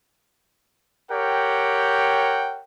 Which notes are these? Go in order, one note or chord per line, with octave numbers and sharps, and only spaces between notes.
G4 A#4 C#5 F#5 G5